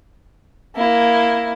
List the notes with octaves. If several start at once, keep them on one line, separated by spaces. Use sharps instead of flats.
A#3 E4